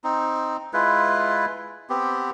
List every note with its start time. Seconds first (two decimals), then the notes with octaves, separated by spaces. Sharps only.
0.04 C4 D#4
0.73 G#3 E4 F4 B4
1.90 B3 C4 G4